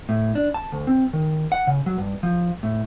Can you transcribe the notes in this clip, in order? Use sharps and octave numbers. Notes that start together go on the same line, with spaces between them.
A2
D4
A5
D2
C4
D#3
F#5
C#3
F#3
G2
F3
A2